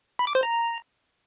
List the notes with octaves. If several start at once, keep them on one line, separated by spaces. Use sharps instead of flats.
B5
D6
C5
A#5